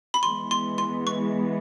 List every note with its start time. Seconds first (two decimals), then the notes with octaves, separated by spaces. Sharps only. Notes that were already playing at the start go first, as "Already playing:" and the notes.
0.14 B5
0.23 E3 G#3 B3 C6
0.51 C6
0.78 C6
1.07 C#6